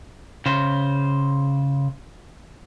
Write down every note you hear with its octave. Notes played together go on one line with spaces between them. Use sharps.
C#3 C5